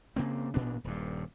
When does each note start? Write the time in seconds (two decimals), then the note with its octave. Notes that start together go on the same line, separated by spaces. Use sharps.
0.16 C#3 A#3 C4
0.54 A1 A#2 B3 D4
0.84 D#1 G2